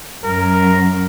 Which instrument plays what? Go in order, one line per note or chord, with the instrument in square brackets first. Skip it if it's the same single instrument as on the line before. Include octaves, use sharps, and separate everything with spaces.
[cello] F#2 [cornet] A#4